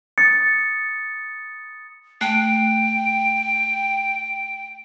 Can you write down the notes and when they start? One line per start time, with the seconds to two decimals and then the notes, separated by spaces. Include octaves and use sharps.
0.18 D#6 A6 C#7
2.21 A3 G5 F#6